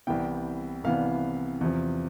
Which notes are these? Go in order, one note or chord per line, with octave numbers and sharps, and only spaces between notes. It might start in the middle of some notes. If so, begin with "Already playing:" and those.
C2 C3 E3 B3 G5
C2 C3 E3 B3 F5
E2 C3 F3